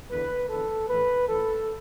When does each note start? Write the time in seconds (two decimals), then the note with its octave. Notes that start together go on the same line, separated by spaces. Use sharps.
0.11 E2 D3 B4
0.49 E2 A4
0.55 D3
0.89 A2 E3 B4
1.28 A2 E3 A4